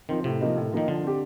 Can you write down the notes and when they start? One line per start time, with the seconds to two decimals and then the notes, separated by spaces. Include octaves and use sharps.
0.09 D#3 F3 C4
0.24 A2 C3
0.41 F3 A#3 D#4
0.56 A2
0.72 D#3 F3 A#3 D#4
0.88 D3 F3
1.04 C4 G4